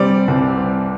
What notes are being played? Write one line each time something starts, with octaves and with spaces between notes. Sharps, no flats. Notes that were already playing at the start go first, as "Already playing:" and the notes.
Already playing: C3 G3 C4 D5
C2